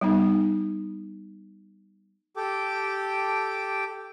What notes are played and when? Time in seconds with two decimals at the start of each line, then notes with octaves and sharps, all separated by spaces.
0.01 G3 B3 D#4
2.37 G4 A4 G5 D6